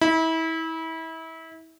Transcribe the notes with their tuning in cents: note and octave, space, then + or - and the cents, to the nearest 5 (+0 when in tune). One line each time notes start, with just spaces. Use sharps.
E4 -30